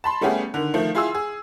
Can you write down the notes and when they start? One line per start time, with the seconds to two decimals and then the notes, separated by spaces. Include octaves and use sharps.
0.04 A5 B5 C6
0.21 G3 A3 B3 C#4 G4 G#4
0.54 D3 D#3
0.74 D#3 F3 A3
0.95 E4 F4 G#4 C6 E6
1.15 G#4